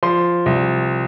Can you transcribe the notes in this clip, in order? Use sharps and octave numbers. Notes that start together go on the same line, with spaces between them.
F3 C6
C2